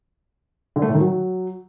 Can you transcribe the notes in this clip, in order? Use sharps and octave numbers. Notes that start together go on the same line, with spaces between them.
D3
A3
A2
D#3
F#3